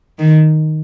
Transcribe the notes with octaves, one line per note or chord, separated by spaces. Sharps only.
D#3